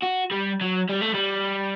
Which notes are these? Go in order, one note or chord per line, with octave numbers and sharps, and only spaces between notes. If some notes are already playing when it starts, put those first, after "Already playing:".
F#4
G3
F#3
G3
A3
G3